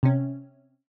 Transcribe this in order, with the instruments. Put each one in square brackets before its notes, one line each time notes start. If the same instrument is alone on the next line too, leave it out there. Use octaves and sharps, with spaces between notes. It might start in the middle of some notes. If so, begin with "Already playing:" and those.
[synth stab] C3 C#4